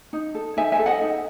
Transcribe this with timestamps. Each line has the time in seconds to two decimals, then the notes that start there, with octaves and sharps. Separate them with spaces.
0.13 D#4
0.35 A4
0.57 D#4 E5 G#5
0.72 E5 G#5
0.79 A4
0.86 D#5 F#5
1.01 D#4